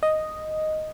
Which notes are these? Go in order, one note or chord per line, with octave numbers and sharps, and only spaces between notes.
D#5